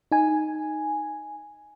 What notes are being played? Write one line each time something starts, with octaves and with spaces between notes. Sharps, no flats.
D#4 G#5